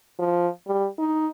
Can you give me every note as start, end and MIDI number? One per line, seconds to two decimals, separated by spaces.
0.19 0.48 53
0.67 0.88 55
0.99 1.28 63